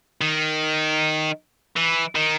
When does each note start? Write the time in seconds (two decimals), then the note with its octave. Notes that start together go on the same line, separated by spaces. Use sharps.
0.21 D#3
1.77 E3
2.15 D#3